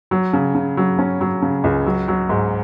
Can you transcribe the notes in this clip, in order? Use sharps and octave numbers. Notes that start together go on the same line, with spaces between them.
F#3
C#3
C#3
F#3
C#4
F#3
C#3
C#2
F#3
F#3
G#2